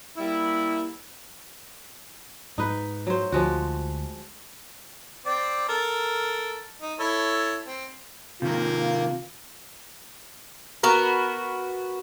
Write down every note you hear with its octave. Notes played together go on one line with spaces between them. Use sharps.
G3 A#3 E4
G#2 D#4 B4
F#3 C5
D2 F3 G#3 F#4
C4 D5
A4 A#4
D#4
E4 A4 C#5
C4
C3 D#3 A#3 F4
B3 F#4 A#4